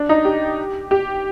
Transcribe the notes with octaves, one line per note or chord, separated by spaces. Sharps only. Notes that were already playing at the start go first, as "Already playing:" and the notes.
Already playing: D4
D#4
G4
G4